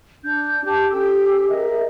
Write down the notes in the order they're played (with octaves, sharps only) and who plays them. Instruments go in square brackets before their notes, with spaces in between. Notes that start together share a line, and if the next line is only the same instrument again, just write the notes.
[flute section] D4 G6
G4 A5 D6 G6
C#4 G4 A4 E6
G#4 A#4 D#5 E5